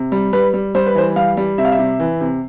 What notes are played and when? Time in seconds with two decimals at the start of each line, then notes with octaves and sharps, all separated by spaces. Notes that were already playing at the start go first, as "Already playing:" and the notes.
Already playing: C3
0.12 G3
0.33 G3 B4
0.54 G3
0.75 G3 C5
0.86 B4
0.95 E3 C5
1.16 G3 F5
1.37 G3
1.58 C3 E5
1.65 F5
1.72 E5
1.79 C3
2.00 E3
2.21 C3